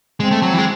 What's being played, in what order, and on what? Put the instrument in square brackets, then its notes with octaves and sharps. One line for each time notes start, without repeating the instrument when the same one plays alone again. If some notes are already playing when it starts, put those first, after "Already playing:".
[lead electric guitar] G#3 [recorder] C4
[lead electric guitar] A3
F#3
E3
G#3